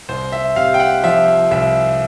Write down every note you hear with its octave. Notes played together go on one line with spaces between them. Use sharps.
C2 C5
E5
C3 F5
G5
F#5
F3 E5
C2 E5